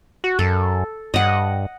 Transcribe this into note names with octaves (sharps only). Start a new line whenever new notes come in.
F#4
F#2 A4
G2 D#5 F#5